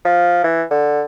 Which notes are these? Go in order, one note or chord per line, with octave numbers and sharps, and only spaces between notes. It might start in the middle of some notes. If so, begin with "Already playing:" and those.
F3
E3
D3